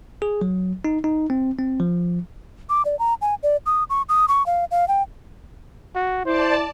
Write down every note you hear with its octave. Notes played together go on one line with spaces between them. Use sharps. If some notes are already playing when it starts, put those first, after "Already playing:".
G#4
F#3
D#4
D#4
C4
C4
F3
D6
D5
A#5
G#5
D5
D#6
C#6
D#6
C#6
F5
F5
G5
F#4
E4 C5 D5 A5